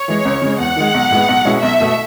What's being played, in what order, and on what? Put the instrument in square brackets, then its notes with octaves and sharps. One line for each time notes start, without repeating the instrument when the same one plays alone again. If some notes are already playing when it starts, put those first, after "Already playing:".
Already playing: [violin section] C#5
[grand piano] E3 G#3
C#2
C#3 G#3
[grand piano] E2 [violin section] F#5
[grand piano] D#3 G#3
B1
A2 G#3 B3
B1
B2 G#3 C#4 E4
[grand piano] B1 [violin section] E5
[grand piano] B2 A3